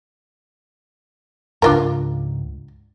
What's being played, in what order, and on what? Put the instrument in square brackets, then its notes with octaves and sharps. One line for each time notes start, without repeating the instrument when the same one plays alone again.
[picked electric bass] C#2 G#2 [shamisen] D4 F4 A#4